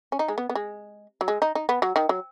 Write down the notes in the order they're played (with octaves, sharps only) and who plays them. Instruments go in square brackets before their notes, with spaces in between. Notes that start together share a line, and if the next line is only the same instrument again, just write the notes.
[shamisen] C#4
D#4
G#3
B3
B3
G#3
F#3
G#3
D#4
D#4
B3
F#3
D#3
F#3